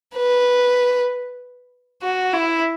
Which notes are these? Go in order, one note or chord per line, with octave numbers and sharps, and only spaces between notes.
B4
F#4
E4